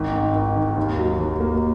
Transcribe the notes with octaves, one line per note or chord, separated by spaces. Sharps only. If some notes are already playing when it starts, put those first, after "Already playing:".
Already playing: G#1
G#2
G#1
D#3
D#2
F#3
D#2
A#3